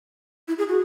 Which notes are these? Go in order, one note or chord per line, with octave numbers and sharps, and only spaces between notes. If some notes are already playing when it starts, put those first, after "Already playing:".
E4
G#4
F#4